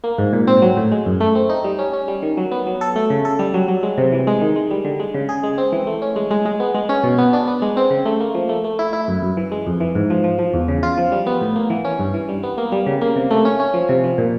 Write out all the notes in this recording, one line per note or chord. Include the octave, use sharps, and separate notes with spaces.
A#3
G#2
A#2
C4
F#3
A2
G#3
F#2
A3
C4
D#4
G3
C#4
C#4
G3
D#3
F#3
B3
F#3
A4
A3
C#3
A4
G3
F#3
F#3
G#3
C3
E3
G#3
D#3
G#3
G3
D3
G#3
C#3
G#4
G#3
C4
E3
A3
C#4
G#3
G#3
G#3
B3
G#3
C#4
B2
B3
D4
B3
G#3
C4
C#3
A3
A#3
F3
A3
A3
E4
E4
F#2
F#2
E3
G#3
F2
E3
G#2
F3
F3
F3
E2
C#3
F4
F3
G3
B3
A2
A#3
E3
C#4
G2
E3
G3
B3
A#3
G3
C#3
A#3
C3
A3
C#4
C#4
F3
C3
F3
A#2